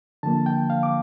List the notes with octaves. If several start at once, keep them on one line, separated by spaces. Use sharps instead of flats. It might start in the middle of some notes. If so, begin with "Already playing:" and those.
D3 F3 A#3 A5
G5
F5
D6